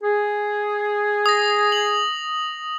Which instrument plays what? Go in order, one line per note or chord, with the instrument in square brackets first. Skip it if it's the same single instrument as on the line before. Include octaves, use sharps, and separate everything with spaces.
[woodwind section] G#4
[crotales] D#6 A#6
F#7